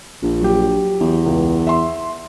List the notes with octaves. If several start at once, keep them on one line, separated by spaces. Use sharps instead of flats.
A#1
F#3 G4
E2
C#2
E5 C6